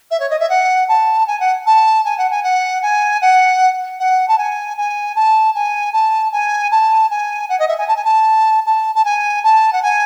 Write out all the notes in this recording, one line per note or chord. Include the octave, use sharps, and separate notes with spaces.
E5
C#5
D#5
E5
F#5
A5
G#5
F#5
A5
G#5
F#5
G#5
F#5
G#5
F#5
F#5
A5
G#5
G#5
A5
G#5
A5
G#5
A5
G#5
F#5
D#5
E5
G#5
A5
G#5
A5
A5
A5
G#5
A5
F#5
G#5